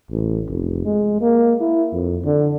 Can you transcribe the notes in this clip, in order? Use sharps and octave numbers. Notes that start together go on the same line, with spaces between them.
A1
F1
G#3
A#3
E4
F2
D3